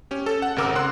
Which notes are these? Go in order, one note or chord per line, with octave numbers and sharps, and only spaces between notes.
C#4 G4
A4
F#5
G#1 C#3 A#4 D6 E6
F#5 C6 F#6